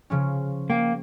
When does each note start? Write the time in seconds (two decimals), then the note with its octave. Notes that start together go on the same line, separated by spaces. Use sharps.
0.10 C#3 F3 C#4
0.70 A#3 G5